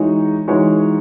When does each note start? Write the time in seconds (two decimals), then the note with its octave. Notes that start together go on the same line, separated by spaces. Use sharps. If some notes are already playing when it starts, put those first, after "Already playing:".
Already playing: E3 G#3 D#4 F#4 C#5
0.48 E3 G#3 D#4 F#4 C#5